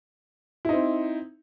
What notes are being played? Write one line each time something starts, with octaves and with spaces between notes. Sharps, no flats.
C4 D#4 E4